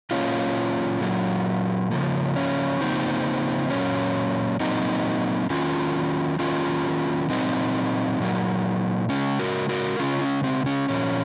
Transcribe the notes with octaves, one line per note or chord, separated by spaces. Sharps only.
A#2 F#3 A#3 C#4 F4
A#2 F#3 A#3
C#3 F3 A#3
C#4
C#3 F3 A#3 C4 D#4
A#2 F#3 A#3 C#4
A#2 F#3 A#3 C4 D#4
D#3 F#3 A#3 C#4 F4
D#3 F#3 A#3 C#4 F4
A#2 F#3 A#3 C4 D#4
A#2 F#3 A#3
C#3 G#3 C#4
F#4 A#4
F#4 A#4
C#3 G#3 C#4 F4
C#4
C4
C#4
A#2 F3 A#3 C#4